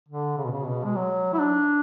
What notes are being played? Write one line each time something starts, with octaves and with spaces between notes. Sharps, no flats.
D3
C#3
B2
C#3
B2
G#3
F#3
E4
D4